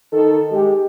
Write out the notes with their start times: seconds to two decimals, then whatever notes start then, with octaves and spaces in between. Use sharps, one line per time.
0.12 D#3 A4
0.52 G#3 G4